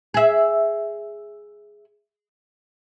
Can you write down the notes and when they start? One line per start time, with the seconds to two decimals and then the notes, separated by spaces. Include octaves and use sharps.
0.14 G#4 E5